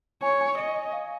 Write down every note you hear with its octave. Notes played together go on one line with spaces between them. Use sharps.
C#5 G#5
G#5
D#5
F5